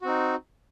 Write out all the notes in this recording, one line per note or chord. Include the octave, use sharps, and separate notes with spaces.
C4 D#4 F#4